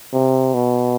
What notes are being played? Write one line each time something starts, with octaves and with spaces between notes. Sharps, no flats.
C3
B2